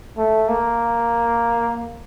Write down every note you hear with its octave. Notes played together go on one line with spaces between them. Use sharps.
A3
A#3